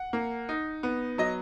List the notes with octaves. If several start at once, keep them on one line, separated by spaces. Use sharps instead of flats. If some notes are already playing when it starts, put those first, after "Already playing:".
Already playing: F#5
A#3
D#4
B3
F#3 D#5